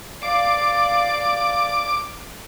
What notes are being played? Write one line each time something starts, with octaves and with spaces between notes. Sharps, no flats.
D5 F5 D6